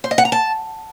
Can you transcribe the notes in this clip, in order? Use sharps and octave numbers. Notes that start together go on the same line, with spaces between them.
C5
D#5
F#5
A#5
A5